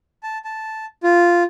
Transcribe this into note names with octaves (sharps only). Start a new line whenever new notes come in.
A5
A5
F4